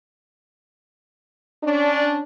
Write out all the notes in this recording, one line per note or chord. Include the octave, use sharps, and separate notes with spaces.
C#4 D4